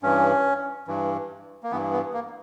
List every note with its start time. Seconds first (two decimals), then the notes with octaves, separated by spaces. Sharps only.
0.03 G2 E3 C#4
0.87 G2 E3
1.63 A#3
1.71 G2 E3 B3
1.93 B3
2.14 A#3